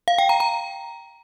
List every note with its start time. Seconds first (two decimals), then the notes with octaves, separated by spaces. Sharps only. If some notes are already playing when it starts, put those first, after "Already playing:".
0.08 F5
0.18 G5
0.29 A#5
0.40 A#5